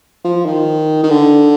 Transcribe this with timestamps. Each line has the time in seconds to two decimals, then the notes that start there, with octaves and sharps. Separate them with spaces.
0.24 F3
0.46 D#3
1.04 D#3
1.10 D3